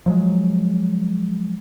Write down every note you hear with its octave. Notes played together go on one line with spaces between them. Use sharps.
F3 F#3 G#3